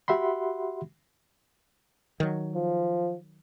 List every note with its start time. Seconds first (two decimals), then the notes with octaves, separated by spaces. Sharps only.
0.08 F#4 G4 E5 F#5 B5 C6
2.20 D#3 F#3
2.55 F3